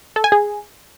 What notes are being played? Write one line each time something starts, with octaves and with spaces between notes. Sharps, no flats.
A4
G#5
G#4